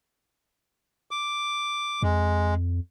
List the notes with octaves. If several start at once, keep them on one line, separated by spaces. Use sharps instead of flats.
D6
F2 G#3